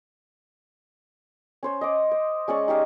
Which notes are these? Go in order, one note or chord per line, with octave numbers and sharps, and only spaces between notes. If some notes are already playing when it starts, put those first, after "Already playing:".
C#4 C5 C#5
D#5 D6
C5
G#3 C#4 D5 C#6
D#4 G4 C#5 F5